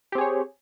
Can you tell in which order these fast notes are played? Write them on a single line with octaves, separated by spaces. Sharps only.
G4 C4 G#4 C#5